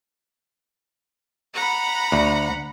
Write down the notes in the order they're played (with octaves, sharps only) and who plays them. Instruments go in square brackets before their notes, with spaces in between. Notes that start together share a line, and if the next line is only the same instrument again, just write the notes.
[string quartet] F#5 A#5 B5
[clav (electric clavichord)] D2